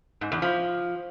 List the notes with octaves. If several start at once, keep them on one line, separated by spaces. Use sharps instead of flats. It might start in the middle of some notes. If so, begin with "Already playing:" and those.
G#2
E2
F3